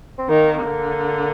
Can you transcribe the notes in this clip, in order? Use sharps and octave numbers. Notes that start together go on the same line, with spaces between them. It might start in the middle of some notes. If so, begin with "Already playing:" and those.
C4
D#3 A#3
D3